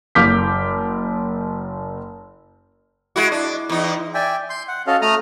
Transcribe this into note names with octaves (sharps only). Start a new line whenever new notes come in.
F#1 D6 F6 G6 B6
G#3 E4 F#4
D4
E2 D#4
D5 E5 G5 G#5
C6 G6
F#5
C#4 F#4 A4 D#5 F5
A3 A#5 D#6 F6